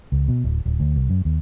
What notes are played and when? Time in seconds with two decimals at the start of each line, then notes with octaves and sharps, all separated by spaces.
0.12 C#2
0.28 B2
0.44 D1
0.66 D1
0.80 D2
0.96 C2
1.10 F#2
1.25 D#2